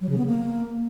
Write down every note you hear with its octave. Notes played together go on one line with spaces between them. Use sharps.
F#3
C#3
B3
A#3